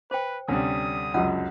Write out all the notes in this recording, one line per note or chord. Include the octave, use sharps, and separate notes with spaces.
B4 C5 G5
D2 C3 G3 C#4 D#6
C#2 F#2 F#5